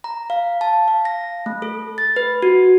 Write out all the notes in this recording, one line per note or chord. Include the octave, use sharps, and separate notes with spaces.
A#5
F5
A5
F5
A#6
A3
A4
A6
B4
F#4